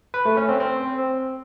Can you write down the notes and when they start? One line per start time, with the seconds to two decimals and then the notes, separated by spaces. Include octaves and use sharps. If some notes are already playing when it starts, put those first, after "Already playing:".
0.14 B4
0.25 A3
0.37 C#4
0.49 C4
0.60 C4